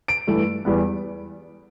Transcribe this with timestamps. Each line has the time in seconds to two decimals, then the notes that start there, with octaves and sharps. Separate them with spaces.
0.08 D7
0.27 G2 E3 A3
0.65 E2 E3 G3 B3